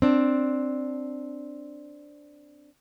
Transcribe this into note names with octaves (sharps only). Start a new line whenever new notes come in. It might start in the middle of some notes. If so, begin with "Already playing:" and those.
C4 D4